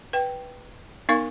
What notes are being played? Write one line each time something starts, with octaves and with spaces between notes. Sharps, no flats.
B4 G5
B3 D#4 A#4 F5 C#6